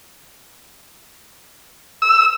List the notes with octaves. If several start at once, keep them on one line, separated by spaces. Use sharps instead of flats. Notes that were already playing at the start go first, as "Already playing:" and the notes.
E6